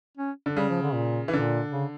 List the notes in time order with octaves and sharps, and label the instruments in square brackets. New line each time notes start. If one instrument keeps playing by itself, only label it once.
[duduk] C#4
[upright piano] D3
[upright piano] C#3 [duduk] G3
[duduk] F3
D3
A#2
[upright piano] E3
[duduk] A#2 [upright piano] D3
[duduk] C#3